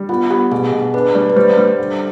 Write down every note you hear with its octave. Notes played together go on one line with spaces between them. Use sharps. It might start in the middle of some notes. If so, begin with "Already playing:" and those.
Already playing: G3
B3 F4
B3 G4
B2 G#4
G#4
B2
G#4
D4 B4
G3 D5
B4
G3 C5
G3
D3